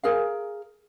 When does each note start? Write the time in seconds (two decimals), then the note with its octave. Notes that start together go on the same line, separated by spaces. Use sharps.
0.03 G#4 A#4 F5